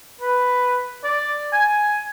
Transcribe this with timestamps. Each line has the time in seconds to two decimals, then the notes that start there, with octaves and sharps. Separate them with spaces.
0.21 B4
1.04 D5
1.52 G#5